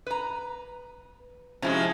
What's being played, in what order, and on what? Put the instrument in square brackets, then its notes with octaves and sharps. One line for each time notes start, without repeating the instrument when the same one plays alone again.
[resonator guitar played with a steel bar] B4 A#5
[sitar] C3 F3 G#3 [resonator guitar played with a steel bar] C#4 E4 F#4